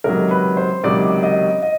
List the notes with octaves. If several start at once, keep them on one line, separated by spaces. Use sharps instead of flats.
C#2 C3 D#3 F#3 A#4
B4
C5
C#2 C3 D#3 F#3 D5
D#5
D#5